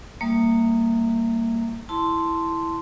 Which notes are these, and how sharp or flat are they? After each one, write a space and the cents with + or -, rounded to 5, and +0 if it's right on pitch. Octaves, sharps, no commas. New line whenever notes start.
G3 +0 A#3 -20 E5 +0
E4 +0 A5 +0 C6 -5